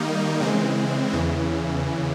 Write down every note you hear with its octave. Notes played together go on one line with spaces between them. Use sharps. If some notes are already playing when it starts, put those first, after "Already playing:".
Already playing: D#3 G3 A#3 D#4
C#3 E3 G#3 C4
E2 C#3 E3